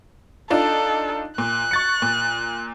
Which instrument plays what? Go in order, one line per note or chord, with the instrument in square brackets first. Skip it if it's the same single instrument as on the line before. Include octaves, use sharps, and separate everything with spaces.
[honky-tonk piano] D4 D#4 F4 [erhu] A4
[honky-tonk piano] A#2 [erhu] F#6
[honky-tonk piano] C#6 A6 C#7
A#2